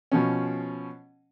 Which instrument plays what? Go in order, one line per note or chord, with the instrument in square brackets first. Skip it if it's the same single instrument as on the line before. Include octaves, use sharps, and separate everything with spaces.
[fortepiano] B2 F3 C#4